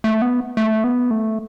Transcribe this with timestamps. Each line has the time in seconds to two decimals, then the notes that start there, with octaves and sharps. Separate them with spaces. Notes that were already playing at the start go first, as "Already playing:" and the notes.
0.04 A3
0.22 B3
0.57 A3
0.84 B3
1.11 A3